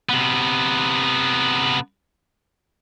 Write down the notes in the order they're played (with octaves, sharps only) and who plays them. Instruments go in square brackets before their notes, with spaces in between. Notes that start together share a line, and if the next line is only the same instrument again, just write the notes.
[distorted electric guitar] C3 B3